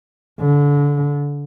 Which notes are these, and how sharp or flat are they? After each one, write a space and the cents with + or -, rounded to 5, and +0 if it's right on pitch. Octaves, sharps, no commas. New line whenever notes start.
D3 -25